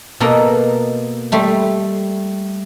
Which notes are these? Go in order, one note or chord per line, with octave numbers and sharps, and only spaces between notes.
B2 A#3 A4 D#5
G3 A3 C6